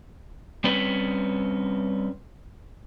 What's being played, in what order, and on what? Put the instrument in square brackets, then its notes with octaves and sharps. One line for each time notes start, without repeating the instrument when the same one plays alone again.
[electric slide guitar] G3 C4 C#4 B4